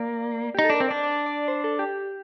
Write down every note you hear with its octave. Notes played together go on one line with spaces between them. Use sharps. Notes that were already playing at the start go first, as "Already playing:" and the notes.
Already playing: A#3 D5
D#4 G4
A4
D4 A#4
C4
D4 D5
D5
D5
C5
A4
G4